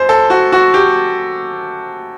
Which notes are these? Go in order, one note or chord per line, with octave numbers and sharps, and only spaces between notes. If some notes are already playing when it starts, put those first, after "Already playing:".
Already playing: F#2 C5
A4
F#4
F#4
G4